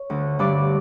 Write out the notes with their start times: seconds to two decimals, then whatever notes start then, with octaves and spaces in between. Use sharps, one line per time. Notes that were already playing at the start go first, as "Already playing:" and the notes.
Already playing: C#5
0.10 D2 D3
0.39 G2 D3 D5